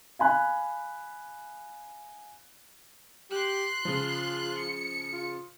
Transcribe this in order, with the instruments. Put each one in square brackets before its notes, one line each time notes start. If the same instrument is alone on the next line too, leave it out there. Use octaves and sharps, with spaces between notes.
[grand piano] F5 G#5 B5 F#6
[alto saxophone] G4 [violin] C6 F#6
[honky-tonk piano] C#3 F3 [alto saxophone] F4
[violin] C#7
[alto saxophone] F4